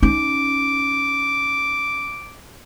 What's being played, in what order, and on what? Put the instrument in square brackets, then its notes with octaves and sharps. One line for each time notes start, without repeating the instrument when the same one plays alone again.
[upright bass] C#4 D#4 [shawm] D6